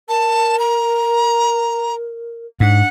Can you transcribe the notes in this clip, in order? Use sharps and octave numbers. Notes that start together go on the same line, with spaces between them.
A#4 A5
A#5
G#2 D4 F#5